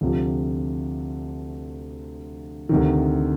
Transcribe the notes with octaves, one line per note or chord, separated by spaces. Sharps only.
D2 C3 F3
D2 C3 D#3